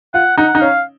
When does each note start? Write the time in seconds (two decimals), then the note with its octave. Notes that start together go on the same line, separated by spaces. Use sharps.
0.14 F4 F#5
0.38 D#4 F#5
0.55 D#4
0.61 C#4 F5